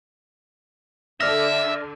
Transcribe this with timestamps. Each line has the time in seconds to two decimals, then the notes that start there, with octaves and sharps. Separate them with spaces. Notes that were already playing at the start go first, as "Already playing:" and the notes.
1.20 D3 D5 E5 F6 A#6